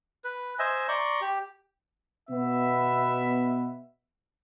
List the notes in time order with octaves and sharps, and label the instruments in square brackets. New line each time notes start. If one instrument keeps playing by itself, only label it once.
[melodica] B4
C5 D#5 E5 G#5
D5 A#5 C6 C#6
G4
[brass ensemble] B2 B3 E5